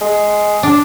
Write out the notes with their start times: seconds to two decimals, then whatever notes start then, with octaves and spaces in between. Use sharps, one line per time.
0.01 G#3
0.63 D4